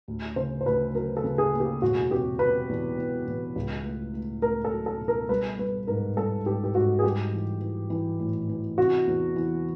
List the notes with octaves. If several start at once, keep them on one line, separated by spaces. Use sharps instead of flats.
D2
C#3 C5
C5
D2 B4
F#3 A#4
A4
C#3
G#4
A#3
G4
E1 F#4
C3 G4
C3 B4
E2
E2
E2
C#2
A3
A3
A3 A#4
A4
F#3
A4
B2
A#4
G3 B4
G3 B4
G#2 A#4
G3 A4
G#2 G4
G4
G#2 F#4
G#4
G3 G4
E3
E3
E3
A2
E3
C3 F#4
E2
E3